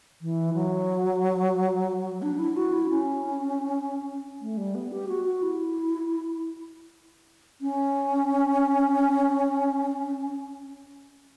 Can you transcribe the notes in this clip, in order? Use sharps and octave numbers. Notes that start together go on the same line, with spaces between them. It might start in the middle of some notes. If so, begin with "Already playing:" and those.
E3
F#3
D4
E4
F#4
E4
C#4
A3
G3
B3
G4
F#4
F#4
E4
C#4